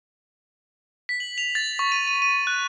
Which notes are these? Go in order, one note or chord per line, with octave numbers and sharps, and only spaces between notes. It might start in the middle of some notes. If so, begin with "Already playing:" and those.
B6
F#7
F7
A6
C#6
D#7
D#7
D#7
F#6